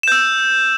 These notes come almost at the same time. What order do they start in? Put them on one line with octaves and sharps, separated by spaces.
E7 G6 E6